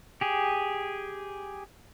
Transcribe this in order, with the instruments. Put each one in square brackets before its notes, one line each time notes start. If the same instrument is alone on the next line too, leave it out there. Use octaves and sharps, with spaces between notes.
[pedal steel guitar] G4 G#4